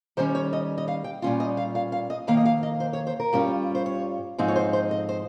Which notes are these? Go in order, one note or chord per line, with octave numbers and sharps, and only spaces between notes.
D#3 G3 C#4 C5
C#5
D#5
D#5
F5
G5
A#2 G3 C#4 F4
D#5
F5
F5
F5
D#5
F2 D#3 A#3 F5
D#5
F5
D#5
C5
C#5
C5
A#4
G2 G3 C#4 F4
C5
C#5
G#2 F3 C4 D#4
C#5
C5
C5
D#5
C5